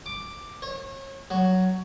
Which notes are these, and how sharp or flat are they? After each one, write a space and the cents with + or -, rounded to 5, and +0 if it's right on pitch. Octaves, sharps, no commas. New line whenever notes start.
D6 +5
C#5 -35
F#3 +5